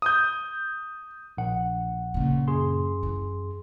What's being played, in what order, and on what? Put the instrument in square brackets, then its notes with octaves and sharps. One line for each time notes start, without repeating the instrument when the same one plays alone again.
[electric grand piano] D#6 G6
[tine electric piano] A#1 F#5
[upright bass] A#2 C#3
[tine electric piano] F#2 G#4 C6
[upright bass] E3